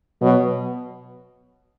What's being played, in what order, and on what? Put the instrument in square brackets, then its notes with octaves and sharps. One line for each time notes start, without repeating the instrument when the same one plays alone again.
[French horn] B2 [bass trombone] F#3